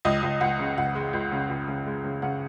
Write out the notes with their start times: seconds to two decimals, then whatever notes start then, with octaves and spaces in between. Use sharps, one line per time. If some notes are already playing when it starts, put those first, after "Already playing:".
0.05 C#2 D#5
0.23 C#2
0.41 C#2 F#5
0.59 C#3
0.77 C#2 F#5
0.95 G#3
1.13 C#2
1.32 C#3
1.50 C#2
1.68 C#3
1.86 G#3
2.04 C#3
2.22 C#3 F#5